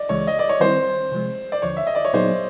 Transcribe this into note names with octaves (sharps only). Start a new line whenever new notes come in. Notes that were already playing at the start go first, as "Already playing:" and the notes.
Already playing: D5 D#5
C#2 C#3 E3 G#3 C#5
D#5
D5
C#5
D#3 G3 C4 E4 C5
C3 F3 G#3
D5
D#2 D3 F3 C#5
E5
D#5
D5
C#5
A#2 F#3 B3 D#4 G#4 C5